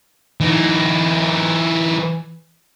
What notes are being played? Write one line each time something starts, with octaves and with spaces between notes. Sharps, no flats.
E3 D#4